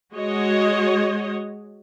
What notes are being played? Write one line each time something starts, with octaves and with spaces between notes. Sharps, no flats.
G#3 F#4 C#5 D#5